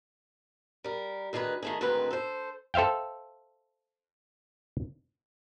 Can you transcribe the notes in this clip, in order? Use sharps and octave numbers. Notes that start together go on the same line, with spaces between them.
G3 A#4
D2 D#3 G#4 A4 B4
D#3 A3 G#4
D2 G#2 D#3 C4 B4
A4 C5
A4 C5 E5 F5 G5